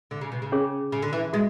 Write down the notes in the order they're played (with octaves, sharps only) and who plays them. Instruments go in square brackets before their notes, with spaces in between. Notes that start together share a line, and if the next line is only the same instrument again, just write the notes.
[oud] D3
C#3
B2
C#3
[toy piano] C#4 G#4 C#5
[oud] C#3
D3
E3
[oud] G#3 [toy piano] F#4